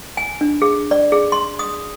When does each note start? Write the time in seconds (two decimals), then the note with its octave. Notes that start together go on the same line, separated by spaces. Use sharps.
0.17 G#5
0.41 D4
0.62 G#4
0.91 D5
1.12 G#4
1.32 C6
1.59 D#6